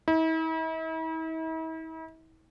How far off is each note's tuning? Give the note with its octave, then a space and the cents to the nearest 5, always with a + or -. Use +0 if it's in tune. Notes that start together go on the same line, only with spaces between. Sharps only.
E4 -45